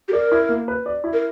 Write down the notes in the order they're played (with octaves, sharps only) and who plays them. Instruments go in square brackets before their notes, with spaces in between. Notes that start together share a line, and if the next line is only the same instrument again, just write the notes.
[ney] G4
[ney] A#4 [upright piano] D5
[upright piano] E4
A#3
B4
D5
E4
[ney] A#4